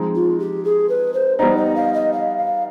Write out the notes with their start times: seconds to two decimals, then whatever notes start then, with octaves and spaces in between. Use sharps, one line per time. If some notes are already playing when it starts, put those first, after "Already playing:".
Already playing: F3 G#3 C4 D#4
0.15 F4
0.40 G4
0.65 G#4
0.89 B4
1.14 C5
1.39 G3 B3 D#4 C5
1.57 D#5
1.76 F5
1.94 D#5
2.13 F5
2.38 F5